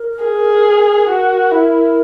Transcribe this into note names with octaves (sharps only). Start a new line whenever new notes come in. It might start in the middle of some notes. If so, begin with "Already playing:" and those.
Already playing: A#4
G#4
F#4 A#4
E4